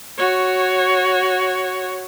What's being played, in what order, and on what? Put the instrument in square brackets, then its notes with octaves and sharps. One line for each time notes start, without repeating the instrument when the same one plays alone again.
[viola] F#4 C#5